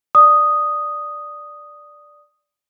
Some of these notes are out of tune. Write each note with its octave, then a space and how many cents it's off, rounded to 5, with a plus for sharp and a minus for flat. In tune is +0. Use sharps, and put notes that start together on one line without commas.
D5 +0 D#6 +0